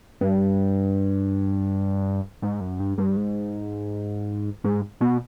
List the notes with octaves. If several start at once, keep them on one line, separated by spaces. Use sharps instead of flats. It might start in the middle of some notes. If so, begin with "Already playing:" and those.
G2
G#2
F#2
G2
G2
G#2
G#2
B2